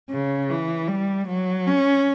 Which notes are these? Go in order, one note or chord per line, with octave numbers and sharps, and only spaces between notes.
C#3
E3
G3
F#3
C#4